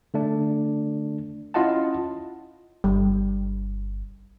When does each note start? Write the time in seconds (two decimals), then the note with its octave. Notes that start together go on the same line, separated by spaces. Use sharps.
0.14 D3 A3 D4
1.54 C#4 E4 F4 D#5 F#5 A5
2.84 G1 G3